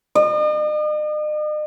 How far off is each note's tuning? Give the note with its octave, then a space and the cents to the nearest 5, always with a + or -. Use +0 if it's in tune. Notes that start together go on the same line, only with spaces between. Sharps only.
D#5 -45